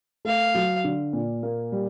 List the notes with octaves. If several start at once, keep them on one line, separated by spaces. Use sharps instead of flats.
A3 F5
F#3
D3
A#2
A#3
G3